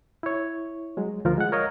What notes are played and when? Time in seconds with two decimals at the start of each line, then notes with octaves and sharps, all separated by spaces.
0.23 E4 C#5
0.97 F#3 G#3
1.25 D2 F3 F4 A#4
1.38 G#3 F#5
1.52 A#4 C#5 D#5 F5